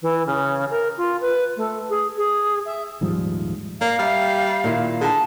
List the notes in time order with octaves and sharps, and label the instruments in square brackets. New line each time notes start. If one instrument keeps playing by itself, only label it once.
[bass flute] E3
C#3
A#4
F4
B4
A3
G#4
G#4
E5
[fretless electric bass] D#1 G#2 F3 G3
[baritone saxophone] A#3 [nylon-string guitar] D5 [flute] F5
[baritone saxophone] G3 [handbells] E5 F6
[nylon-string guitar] A#2 D#3 E4
[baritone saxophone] D3 [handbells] G#4 A5